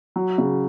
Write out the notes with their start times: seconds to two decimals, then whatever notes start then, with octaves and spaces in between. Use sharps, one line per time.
0.16 F#3
0.38 C#3